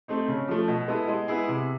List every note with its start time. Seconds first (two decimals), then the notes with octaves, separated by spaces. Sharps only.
0.08 A3 C4 D#4
0.28 C#3
0.48 F3 A3
0.68 B2
0.88 G#3 B3 E4 A4
1.08 G#3
1.28 B3 E4 G#4
1.48 C3